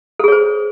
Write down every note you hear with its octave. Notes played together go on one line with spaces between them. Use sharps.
G#4 A4 C5 C#5